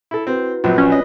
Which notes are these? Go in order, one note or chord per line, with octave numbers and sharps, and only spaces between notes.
E4 A4
C4 E4 F#4 B4
A#1 F#3 C4 F4 B4
C#4 D5
B4 D#5